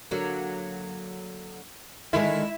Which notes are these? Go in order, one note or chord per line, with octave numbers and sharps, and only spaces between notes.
D3 F#3 A#3
D3 D#3 G#3 E4